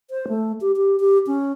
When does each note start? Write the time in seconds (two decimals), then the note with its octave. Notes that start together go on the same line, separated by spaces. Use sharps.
0.11 C5
0.28 A3
0.61 G4
0.77 G4
1.00 G4
1.27 C#4